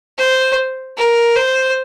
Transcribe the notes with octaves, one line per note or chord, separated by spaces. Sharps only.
C5
A#4
C5